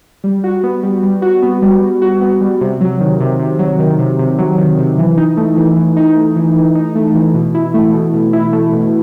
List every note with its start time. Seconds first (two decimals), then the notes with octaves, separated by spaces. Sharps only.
0.24 G3
0.44 F#4
0.63 B3
0.83 G3
1.03 G3
1.22 F#4
1.42 B3
1.62 G3
1.82 G3
2.02 F#4
2.21 B3
2.41 G3
2.61 C3
2.81 F#3
3.00 D#3
3.20 C3
3.39 C3
3.59 F#3
3.79 D#3
3.99 C3
4.19 C3
4.39 F#3
4.58 D#3
4.78 C3
4.98 E3
5.17 D#4
5.37 A3
5.57 E3
5.76 E3
5.97 D#4
6.16 A3
6.36 E3
6.56 E3
6.75 D#4
6.95 A3
7.15 E3
7.34 B2
7.55 E4
7.74 A3
7.93 B2
8.14 B2
8.33 E4
8.53 A3
8.73 B2